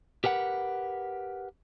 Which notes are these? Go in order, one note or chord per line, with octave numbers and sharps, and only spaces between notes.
G4 A#4 B4 F#5